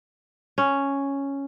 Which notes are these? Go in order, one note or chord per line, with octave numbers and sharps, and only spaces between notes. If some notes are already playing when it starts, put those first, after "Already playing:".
C#4